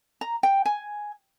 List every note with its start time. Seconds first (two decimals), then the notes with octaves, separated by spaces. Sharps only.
0.21 A#5
0.43 G5
0.66 G#5